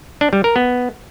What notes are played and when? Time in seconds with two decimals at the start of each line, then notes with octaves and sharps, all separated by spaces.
0.21 D4
0.33 G3
0.44 A#4
0.56 B3